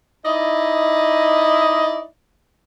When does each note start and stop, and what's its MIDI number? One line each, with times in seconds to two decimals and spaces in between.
0.25 2.05 63
0.25 2.05 64
0.25 2.05 74
0.25 2.05 75